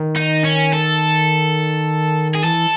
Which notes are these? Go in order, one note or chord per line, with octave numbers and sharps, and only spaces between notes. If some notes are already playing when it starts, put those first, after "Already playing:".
Already playing: D#3
D#4
C#4
A4
G#4
E3 A4